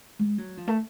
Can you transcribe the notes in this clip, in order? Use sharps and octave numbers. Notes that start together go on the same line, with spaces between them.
G#3
F#3
F3
A3